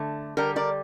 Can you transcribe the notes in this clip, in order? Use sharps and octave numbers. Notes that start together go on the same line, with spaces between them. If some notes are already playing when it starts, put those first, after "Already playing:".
Already playing: D3 A3
D3 G3 G4 A#4
A#4 D5